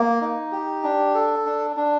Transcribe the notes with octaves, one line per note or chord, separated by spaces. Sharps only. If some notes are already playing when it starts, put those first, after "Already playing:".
Already playing: A#3
D#4
G4
D4
A4
D4
D4